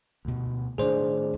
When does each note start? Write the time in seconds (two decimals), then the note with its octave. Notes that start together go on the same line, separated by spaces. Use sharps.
0.25 D2 B2
0.78 A2 D#3 D4 G#4 C5 D5